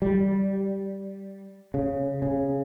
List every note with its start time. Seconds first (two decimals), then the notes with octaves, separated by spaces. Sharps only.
0.02 G3
1.74 C#3
2.22 C#3